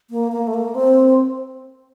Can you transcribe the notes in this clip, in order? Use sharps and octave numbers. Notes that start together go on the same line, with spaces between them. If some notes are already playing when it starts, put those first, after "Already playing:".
A#3
A#3
A3
A#3
C4